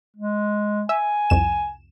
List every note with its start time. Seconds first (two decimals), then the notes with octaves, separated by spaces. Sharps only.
0.17 G#3
0.89 E5 G#5
1.30 C2 F2 E7